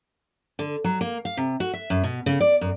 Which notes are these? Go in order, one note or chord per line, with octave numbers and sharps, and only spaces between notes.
D3
F#3
A#3
F5
C3
F#4
E5
F#2
B2
C#3
D5
F#2